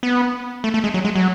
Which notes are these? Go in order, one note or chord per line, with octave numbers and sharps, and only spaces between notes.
B3
A3
A3
G#3
F#3
G#3
F#3